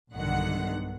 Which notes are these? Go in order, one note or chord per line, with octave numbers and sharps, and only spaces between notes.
B1 G2 D3 D#3 F#5